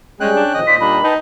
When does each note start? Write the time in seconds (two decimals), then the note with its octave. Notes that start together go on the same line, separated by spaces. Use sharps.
0.20 G3 G#3 C#4 G#4 G5 F#6
0.36 D4
0.54 A#2 D#3 F3 D#5
0.67 A#2 D#4 F4 C5 D5 B6
0.81 G3 A#3 D4 B5
1.04 D#4 B4 D#5 G5 A5